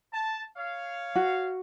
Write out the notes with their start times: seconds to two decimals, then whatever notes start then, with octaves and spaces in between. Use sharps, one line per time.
0.13 A5
0.57 C#5 F5
1.16 F#4